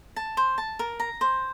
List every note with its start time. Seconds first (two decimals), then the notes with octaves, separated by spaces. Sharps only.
0.16 A5
0.37 C5
0.58 A5
0.79 A#4
1.00 A#5
1.21 C5